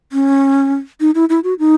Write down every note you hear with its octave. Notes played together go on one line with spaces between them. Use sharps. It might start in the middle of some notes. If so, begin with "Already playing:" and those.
C#4
D#4
E4
E4
F#4
D#4